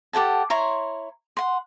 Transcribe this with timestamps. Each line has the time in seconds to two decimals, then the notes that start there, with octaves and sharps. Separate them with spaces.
0.13 G4 A4 F#5 A5
0.50 E4 C#5 A#5 C6
1.37 F#5 C6